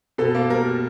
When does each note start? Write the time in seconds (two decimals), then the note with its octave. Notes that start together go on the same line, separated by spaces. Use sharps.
0.18 B2 A4
0.35 A#3
0.50 G3 A#4
0.66 B2